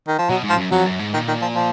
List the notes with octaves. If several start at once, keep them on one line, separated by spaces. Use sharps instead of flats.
D#3
F3
B2 F#3
G#2
F3
F#2
F2 F#3
F#2
G#2
A#2 D#3
D#3
F3
F3